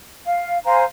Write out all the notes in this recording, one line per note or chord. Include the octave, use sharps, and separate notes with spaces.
F5
C5 F5 G#5 A#5